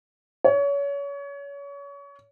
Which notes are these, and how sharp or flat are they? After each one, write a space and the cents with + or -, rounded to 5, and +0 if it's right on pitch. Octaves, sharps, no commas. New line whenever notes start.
C#5 +30